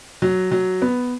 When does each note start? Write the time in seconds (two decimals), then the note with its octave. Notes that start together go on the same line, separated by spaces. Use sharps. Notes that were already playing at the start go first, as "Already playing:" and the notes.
0.22 F#3
0.51 F#3
0.82 B3